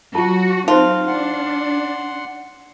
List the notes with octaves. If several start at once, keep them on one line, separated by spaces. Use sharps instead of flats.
F#3 F4 F#4 A5
C4 D#4 F4 C5
D4 F#5 C6